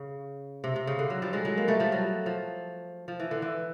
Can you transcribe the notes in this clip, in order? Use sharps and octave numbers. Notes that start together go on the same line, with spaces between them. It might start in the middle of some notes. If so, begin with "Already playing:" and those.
Already playing: C#3
C3
C3
C#3
D3
F#3
F3 G3
F#3 G#3
F#3 G#3
A#3
G3 A3
F3 G3
F#3
F3
F3
E3
D3
E3